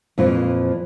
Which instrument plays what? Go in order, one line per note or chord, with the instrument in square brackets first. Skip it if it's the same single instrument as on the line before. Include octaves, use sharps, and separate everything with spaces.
[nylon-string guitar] F2 A#2 E3 F3 F4